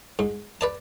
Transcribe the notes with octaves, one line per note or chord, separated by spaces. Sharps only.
G#2
B4 D5 A5